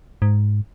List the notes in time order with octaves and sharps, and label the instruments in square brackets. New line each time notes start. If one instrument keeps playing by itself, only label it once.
[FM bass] G#2